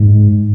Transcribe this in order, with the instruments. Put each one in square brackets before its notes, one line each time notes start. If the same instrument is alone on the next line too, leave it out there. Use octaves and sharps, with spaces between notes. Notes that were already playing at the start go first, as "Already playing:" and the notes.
Already playing: [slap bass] G#2